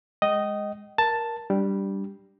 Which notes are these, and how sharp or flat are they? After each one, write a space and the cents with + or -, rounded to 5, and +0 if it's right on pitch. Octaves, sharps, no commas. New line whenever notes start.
G#3 +0 D#5 +0 G5 -35
A#4 +10 A5 +5
G3 +0 D4 +0